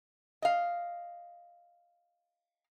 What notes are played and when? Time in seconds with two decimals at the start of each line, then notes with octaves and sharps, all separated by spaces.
0.42 D#5 F5